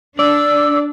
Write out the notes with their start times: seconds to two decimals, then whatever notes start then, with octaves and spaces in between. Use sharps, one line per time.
0.19 D4 D5 E6